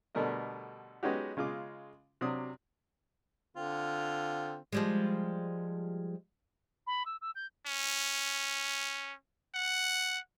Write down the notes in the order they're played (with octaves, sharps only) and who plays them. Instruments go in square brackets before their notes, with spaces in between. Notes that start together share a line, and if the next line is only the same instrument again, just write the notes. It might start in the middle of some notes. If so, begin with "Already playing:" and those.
[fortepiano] B2 D3 G3 A3 A#4 D#5
G#3 B3 C#4 D#4 F#4 G4
C#3 G#3 F4 D#5 D6
C3 F#3 C4 D4 D#6
[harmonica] D3 C4 F4
[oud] F3 G3 G#3
[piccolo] B5
E6
E6
G6
[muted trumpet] C#4
F#5